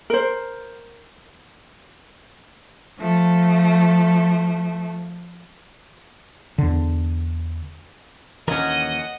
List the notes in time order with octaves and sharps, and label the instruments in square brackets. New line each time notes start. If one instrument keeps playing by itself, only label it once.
[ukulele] A#4 C5
[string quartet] F3 A3
[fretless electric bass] E2 D3
[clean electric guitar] D#2 E3 A#4 [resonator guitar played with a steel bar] A#2 C#4 [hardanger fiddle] D#5 F#5